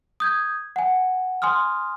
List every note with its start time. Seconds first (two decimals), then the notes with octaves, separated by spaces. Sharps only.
0.20 D#6 G6 G#6
0.76 F#5 G#5
1.42 G#5 C6 D#6 F6